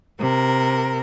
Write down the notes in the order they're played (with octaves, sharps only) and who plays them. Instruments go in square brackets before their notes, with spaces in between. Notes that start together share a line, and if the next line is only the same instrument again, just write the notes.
[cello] C3 A#4